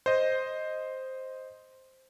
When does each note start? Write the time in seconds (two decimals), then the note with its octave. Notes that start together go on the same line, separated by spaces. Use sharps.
0.06 C5 D#5